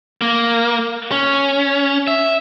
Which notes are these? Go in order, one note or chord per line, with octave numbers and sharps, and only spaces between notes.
A#3
C#4
E5